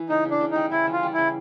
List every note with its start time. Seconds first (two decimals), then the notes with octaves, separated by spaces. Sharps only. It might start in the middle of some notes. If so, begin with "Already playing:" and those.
Already playing: E3
0.09 C#3 D#4
0.25 C#3
0.31 D4
0.41 C#3
0.51 G3 D#4
0.72 C#3 E4
0.87 E3 F4
1.03 G3
1.13 C#3 E4